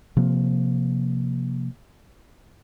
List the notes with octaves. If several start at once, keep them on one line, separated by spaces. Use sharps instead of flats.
C3 F3 A#3